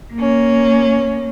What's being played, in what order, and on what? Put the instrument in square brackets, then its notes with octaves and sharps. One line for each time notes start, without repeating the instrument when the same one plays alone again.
[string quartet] A#3 C#4